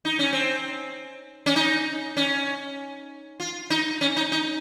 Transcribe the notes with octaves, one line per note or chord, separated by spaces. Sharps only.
D#4
C#4
C4
C#4
D#4
C#4
F4
D#4
C#4
D#4
D#4